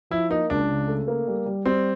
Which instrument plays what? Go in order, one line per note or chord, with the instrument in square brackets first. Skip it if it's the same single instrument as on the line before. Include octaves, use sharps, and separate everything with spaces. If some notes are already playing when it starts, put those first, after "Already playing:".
[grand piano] F3 [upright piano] E4
[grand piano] A#3 [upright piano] D#4
[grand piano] C#2 [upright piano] D4
[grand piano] C#3
A3
A#3
G3
G3
[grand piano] G3 [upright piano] C4